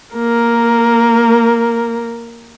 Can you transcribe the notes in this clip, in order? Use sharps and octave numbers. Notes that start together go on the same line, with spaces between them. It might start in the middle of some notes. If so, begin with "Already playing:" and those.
A#3 A#4